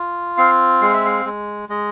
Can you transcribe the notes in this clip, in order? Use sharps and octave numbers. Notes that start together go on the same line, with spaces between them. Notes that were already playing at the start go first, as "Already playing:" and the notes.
Already playing: F4
C4 F5
G#3 F5
E5
F5
G#3
G#3 D#5